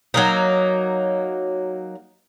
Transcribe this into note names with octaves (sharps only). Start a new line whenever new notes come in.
F#3 A#3 D#4